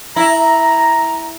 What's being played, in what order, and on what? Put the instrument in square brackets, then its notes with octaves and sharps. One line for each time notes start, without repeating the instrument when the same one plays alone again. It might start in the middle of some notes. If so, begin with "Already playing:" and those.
[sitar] E4 [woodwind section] A#5